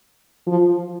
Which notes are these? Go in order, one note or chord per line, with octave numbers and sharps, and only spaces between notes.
F3